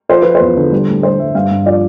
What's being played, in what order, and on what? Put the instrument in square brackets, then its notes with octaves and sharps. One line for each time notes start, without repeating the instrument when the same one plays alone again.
[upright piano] F3 C5
F3 B4
C5
E2
D3
G3
A2
G3 C5
G3 E5
G2 F5
G2
F3 D5